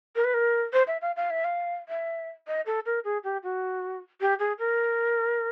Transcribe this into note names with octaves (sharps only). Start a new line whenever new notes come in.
A#4
B4
A#4
C5
E5
F5
F5
E5
F5
E5
D#5
A4
A#4
G#4
G4
F#4
G4
G#4
A#4